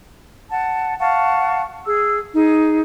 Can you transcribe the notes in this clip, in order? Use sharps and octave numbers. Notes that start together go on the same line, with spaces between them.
F#5 A5
F5 F#5 A5 C#6
G#4 E6
D#4 G#4